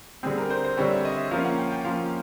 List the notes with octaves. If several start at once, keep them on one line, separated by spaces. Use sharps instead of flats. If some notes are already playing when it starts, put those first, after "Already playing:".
D3 G3 C4 G#4
A#4
C5
C5
D3 G3 C4 C#5
E5
D#5
E5
F3 A#3 C#4 F5
F#5
G5
G5
F3 A#3 C#4 F5